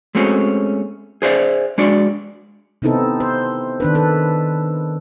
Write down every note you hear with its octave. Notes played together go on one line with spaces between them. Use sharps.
G#3 A3 C4 C#4 F#4
G#4 C5 D5 E5
G#3 D4 F#4 D5
C3 B3 C4 D#4 E4 A4
C5
D#3 D4 B4
A4 B4